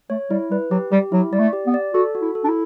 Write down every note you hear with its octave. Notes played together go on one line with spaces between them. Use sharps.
A3 C#5
G3 E4
G3 B4
F#3 G4
G3 G4
F#3 E4
G3 D5
A3
G4
B3
D5
F#4 A4
F#4
E4
A4
D4
E4